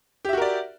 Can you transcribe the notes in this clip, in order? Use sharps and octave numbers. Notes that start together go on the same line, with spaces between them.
F#4 G4 A#4 D5 E5